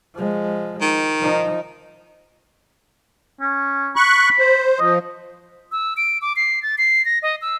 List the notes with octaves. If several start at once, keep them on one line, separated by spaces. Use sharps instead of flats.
F3 G#3
D#3
F3 D#4
C#4
B5 C#6 F#6
C5
F3 D#5
E6
D7
D6
C7
A6
C7
A#6
D#5
E6